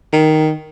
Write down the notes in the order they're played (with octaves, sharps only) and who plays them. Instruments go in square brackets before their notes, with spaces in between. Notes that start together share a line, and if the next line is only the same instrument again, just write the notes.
[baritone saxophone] D#3